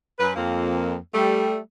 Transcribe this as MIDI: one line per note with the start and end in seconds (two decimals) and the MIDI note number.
0.19 0.31 42
0.19 0.31 71
0.36 0.97 41
0.36 0.97 58
1.14 1.57 55
1.14 1.57 57